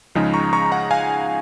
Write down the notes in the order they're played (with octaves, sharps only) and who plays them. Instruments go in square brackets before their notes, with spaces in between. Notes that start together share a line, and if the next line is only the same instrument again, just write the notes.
[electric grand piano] C#2 C#3 F3 G#3 D#4
A#5 C#6
A#5 C#6
F#5 A#5
F5 G#5